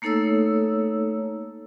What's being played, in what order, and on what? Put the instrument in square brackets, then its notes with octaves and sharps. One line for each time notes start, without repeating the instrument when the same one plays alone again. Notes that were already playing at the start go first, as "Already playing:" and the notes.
[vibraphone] A3 A#3 D#4 A4 C#5 E6